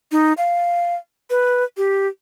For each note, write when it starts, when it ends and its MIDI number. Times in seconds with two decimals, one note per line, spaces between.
0.12 0.33 63
0.38 0.96 77
1.30 1.64 71
1.77 2.07 67